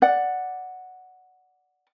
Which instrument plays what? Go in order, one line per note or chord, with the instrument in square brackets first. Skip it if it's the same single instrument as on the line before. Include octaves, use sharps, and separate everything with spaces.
[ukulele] D5 F#5